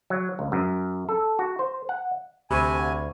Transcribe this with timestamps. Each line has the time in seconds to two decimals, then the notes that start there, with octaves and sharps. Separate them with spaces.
0.10 F#3
0.39 C#2
0.52 F#2
1.09 A4
1.39 F#4
1.59 C5
1.89 F#5
2.51 D2 C3 G#5 B5 C#6 D#7